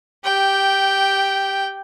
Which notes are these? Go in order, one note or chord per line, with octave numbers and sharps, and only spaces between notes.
G4 G5